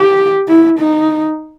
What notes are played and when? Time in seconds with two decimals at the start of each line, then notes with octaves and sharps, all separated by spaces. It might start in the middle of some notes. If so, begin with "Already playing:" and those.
Already playing: G4
0.49 E4
0.79 D#4